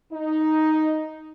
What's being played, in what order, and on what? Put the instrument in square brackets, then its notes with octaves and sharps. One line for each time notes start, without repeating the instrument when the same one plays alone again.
[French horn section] D#4